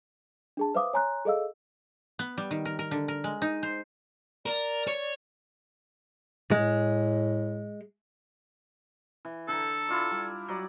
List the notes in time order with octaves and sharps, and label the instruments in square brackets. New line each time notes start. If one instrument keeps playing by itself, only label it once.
[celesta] D4 G#4 A5
B4 C5 E5 F5 D6 D#6
C#5 G#5 A#5 C6 F#6
G#4 A4 D#5 F5 E6
[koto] B3
G3
D#3
A#4
A#4
D3
A#4
G#3
D#4
C5
[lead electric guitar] A#4 [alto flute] D5
[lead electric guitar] C#5
[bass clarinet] A2 [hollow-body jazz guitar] G#3
[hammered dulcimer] E3
[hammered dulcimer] D3 A#5 [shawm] A4
[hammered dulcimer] E4 F4 D5
G3
F#3 D5